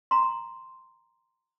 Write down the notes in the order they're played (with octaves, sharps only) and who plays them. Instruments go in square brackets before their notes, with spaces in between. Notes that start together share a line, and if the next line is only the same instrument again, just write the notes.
[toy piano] A#5 C6